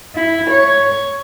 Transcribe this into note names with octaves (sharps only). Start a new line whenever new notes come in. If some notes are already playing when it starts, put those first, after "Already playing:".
E4
C#5